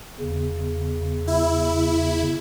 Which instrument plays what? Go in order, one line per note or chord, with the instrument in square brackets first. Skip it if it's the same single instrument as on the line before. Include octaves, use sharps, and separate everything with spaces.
[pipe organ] E2 C#3
[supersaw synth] E4